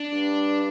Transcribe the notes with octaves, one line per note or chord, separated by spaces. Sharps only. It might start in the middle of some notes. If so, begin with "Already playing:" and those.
Already playing: D4
G2